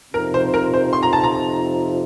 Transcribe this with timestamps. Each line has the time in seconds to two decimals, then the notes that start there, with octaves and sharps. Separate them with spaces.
0.14 F2 C3 F3 C4 D#4 A#4
0.34 C5
0.54 A#4
0.74 C5
0.93 C6
1.03 A#5
1.13 A5
1.24 A#5